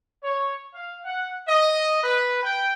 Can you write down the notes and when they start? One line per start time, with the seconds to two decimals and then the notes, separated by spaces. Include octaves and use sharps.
0.24 C#5
0.75 F5
1.05 F#5
1.48 D#5
2.03 B4
2.43 G5